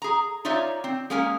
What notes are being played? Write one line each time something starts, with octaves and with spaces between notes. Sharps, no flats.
G#4 A#5
D#4 F4 C#5 D5 E5
C4
G#3 A#3 C#4 A#4 G#5